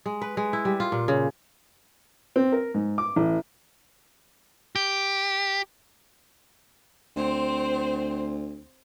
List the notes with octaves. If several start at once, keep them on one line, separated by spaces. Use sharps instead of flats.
G#3
B4
G#3
E4
G3
F4
A#2
C#3
C4
A#4
G#2
D6
A1
G4
D2 C4 C5